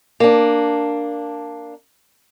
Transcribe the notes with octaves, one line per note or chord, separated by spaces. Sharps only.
A#3 D4